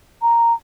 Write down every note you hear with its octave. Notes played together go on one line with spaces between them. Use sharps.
A#5